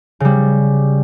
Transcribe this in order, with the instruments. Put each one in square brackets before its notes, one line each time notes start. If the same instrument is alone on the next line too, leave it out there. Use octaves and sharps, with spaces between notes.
[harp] C#3 G3